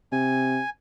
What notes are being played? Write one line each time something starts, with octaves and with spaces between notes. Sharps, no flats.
C3 G#5